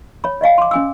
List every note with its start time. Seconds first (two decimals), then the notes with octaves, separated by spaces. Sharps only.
0.24 C#5 B5
0.41 D5 D#5 F5 G#5
0.58 C6 D6
0.71 C#4 G#5 E6